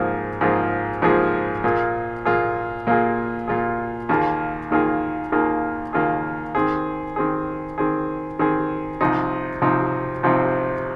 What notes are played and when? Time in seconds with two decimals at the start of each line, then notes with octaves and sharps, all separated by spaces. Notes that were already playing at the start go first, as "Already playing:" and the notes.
Already playing: G#2 F3 A#3 F4 G#4
0.41 G#2 F3 A#3 F4 G#4
1.02 G#2 F3 A#3 F4 G#4
1.64 A#2 A#3 F4 G#4
2.25 A#2 A#3 F4 G#4
2.87 A#2 A#3 F4 G#4
3.48 A#2 A#3 F4 G#4
4.09 D#2 D#3 A#3 F4 G#4
4.71 D#2 D#3 A#3 F4 G#4
5.32 D#2 D#3 A#3 F4 G#4
5.93 D#2 D#3 A#3 F4 G#4
6.55 D#3 C4 G#4
7.16 D#3 C4 G#4
7.78 D#3 C4 G#4
8.39 D#3 C4 G#4
9.01 C2 C3 F3 C4 D#4
9.62 C2 C3 F3 C4 D#4
10.23 C2 C3 F3 C4 D#4